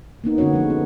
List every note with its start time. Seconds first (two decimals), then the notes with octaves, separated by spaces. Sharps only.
0.24 A#3 B3 D#4
0.38 D3 B3 C#4 F#4 C#5
0.53 F3 G#3
0.70 B3